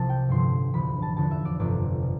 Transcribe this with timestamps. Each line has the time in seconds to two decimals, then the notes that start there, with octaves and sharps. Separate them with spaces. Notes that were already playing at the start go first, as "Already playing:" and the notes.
Already playing: C2 C3 F3 A5
0.09 G5
0.29 A1 G2 D3 F3 C6
0.74 E1 D2 D3 F3 B5
1.02 A5
1.17 F1 E2 D3 F3 A5
1.31 E5
1.45 D5
1.59 G1 F2 C3 D5
2.02 B2